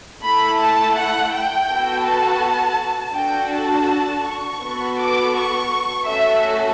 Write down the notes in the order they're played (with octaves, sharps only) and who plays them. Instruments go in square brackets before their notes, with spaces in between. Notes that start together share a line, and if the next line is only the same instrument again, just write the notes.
[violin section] A3 E4 A4 B5
A5
F#5
G5
B3 F#4 A4
A5
D4 F#4 A4 G5
A5
C#6
B3 F#4 A4
D6
C#6
A3 C#4 F#4 A4 E5